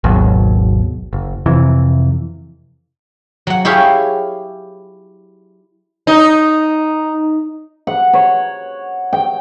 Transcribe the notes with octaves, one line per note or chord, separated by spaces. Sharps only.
G#1 D#2 B2 F#3
F#1
F2 C3 E3
F#3 F#5
E4 G4 G#4 C#5 F5
D#4
F#5
C#5
G5